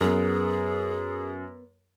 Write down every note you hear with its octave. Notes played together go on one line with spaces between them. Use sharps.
F#2 B3 G#4 A#4